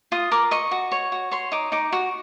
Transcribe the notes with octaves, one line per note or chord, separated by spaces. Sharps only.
F4 D#6
A#4 D6
D#5 C#6
F#4
C#5
F#4
C#5 C6
D#4 D6
D#4 D6
F#4